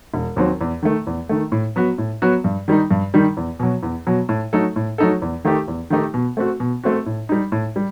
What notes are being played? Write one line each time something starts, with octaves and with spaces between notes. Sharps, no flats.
E1
D#2 D#3 F#3 C4
E2
D#3 A3
E2
D#3 A3
A2
F#3 B3 F#4
A2
F#3 B3 F#4
G2
D#3 G3 D#4
G2
D#3 G3 D#4
E2
B2 F#3
E2
B2 F#3
A2
F#3 A3 D#4 A4
A2
F#3 A3 D#4 A4
E2
D#3 A3 D#4 G4
E2
D#3 A3 D#4 G4
B2
A3 C4 F#4
B2
A3 C4 F#4
A2
G3 D#4
A2
G3